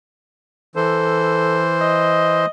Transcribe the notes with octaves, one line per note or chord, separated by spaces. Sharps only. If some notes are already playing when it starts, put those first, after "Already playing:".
E3 A4 C5
D#5